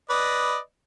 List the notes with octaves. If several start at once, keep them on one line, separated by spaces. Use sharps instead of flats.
B4 D5 D#5